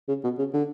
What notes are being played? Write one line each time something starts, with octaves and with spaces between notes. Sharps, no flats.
C#3
B2
C#3
D3